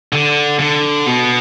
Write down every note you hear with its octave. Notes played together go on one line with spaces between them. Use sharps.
D3
D3
B2